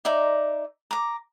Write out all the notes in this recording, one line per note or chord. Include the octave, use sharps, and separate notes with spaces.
D#4 D5 E5 A#5
A#5 D6